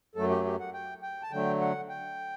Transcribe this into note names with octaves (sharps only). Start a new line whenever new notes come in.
F#2 F#3 A3 A4
G4
G4
F#5
G5
G5
A5
D3 F#3 A3 G5
F#5
G5